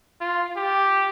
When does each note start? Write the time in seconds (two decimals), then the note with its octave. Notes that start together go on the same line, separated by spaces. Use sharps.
0.21 F4
0.56 G4